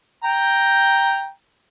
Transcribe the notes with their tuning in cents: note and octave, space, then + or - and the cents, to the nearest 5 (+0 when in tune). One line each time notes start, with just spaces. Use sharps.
G5 +0 A#5 +0